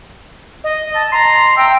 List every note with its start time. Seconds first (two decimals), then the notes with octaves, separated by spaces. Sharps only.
0.64 D#5
0.95 A5
1.12 A#5 C6
1.57 E5 G5